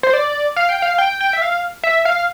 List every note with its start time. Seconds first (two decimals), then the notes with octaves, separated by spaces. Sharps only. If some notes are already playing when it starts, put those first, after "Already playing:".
0.03 C5
0.13 D5
0.56 F5
0.69 G5
0.82 F5
0.98 G5
1.21 G5
1.33 E5
1.42 F5
1.83 E5
2.05 F5